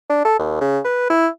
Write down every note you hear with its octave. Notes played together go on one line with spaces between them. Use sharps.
D4
A4
D#2
C#3
B4
E4